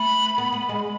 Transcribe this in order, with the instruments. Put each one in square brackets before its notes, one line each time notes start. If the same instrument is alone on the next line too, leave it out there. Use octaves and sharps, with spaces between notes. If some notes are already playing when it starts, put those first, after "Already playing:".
Already playing: [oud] A3 [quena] B5
[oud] B3
B3
G#3